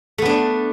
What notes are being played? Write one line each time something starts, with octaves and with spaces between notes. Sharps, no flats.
A3 B3 D4